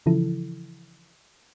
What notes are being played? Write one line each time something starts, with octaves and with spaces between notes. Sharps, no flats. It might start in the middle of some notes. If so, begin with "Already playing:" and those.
C#3 E3 F3 E4 A4